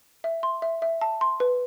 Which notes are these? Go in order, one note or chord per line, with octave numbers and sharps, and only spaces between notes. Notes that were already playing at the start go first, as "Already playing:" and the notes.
E5
C6
E5
E5
A5
C6
B4